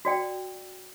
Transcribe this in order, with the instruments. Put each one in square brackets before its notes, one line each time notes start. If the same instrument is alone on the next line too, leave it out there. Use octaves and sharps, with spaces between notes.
[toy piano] F#4 D5 G5